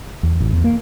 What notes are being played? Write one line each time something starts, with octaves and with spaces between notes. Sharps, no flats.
E2
A1
E2
A#3